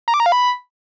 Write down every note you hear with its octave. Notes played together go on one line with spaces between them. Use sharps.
A#5
D6
A#5
F5
B5